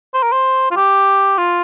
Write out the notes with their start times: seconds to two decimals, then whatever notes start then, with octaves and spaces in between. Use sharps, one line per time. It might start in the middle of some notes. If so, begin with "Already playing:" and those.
0.14 C5
0.23 A#4
0.32 C5
0.71 F4
0.76 G4
1.38 F4